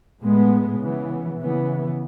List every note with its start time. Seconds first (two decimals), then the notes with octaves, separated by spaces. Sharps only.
0.21 A2 G#3 B3
0.80 C#3 E3 B3
1.39 C#3 E3 B3